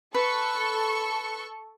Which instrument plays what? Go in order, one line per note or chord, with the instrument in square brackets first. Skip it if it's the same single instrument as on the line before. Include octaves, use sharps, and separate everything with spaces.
[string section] A4 C#6 [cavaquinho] B4